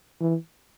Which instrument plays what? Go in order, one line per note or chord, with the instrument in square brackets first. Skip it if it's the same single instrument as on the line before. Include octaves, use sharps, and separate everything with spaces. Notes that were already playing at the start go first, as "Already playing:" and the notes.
[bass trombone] E3